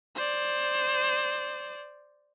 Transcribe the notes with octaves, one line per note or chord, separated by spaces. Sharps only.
C5 D5